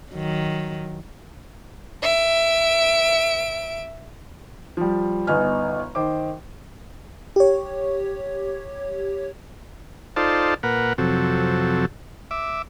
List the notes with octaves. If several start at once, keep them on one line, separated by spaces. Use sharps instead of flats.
D#3 F#3
E5 D7
F3 G3
G1 B3 D#4 G#5 F6
D#3 C5 D6
G4 C#5
D#4 F4 A4 C5 D5 A5
A#2 A#4 B4 F#5
F2 C3 F#3 A4
E5 D6